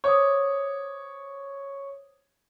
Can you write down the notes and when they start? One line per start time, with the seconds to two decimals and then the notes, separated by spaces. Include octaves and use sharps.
0.04 C5 C#5 D6 D#6